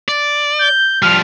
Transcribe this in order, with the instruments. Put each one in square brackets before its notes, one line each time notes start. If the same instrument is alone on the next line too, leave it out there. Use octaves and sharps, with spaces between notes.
[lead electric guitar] D5
[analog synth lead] G6
[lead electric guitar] F3 G3 [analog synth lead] F6